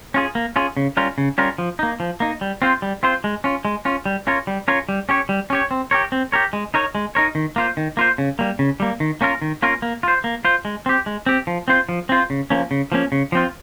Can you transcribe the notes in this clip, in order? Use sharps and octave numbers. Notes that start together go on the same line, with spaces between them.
C#4 F4 G#4
A#3
C#4 F4 G#4
C#3
G3 C#4 F4 A#4
C#3
G3 C#4 F4 A#4
F3
A#3 D#4
F3
A#3 D#4
G3
C4 F4 C5
G3
C4 F4 C5
G#3
C#4 F4
G#3
C#4 F4
G3
C#4 F4 A#4 C#5
G3
C#4 F4 A#4 C#5
G3
C#4 G4 C#5
G3
C#4 G4 C#5
C4
G4 A#4 C#5
C4
G4 A#4 C#5
G#3
D#4 A#4 C#5
G#3
D#4 A#4 C#5
D#3
A#3 F4 C5
D#3
A#3 F4 C5
C#3
G3 A#3
C#3
G3 A#3
D#3
A#3 C#4 F4 A#4
D#3
A#3 C#4 F4 A#4
A#3
F4 C5
A#3
F4 C5
G#3
C4 G4
G#3
C4 G4
F3
C4 F4 C5
F3
C4 F4 C5
C#3
F3 A#3 C#4
C#3
F3 A#3 C#4
C#3
F3 C4 F4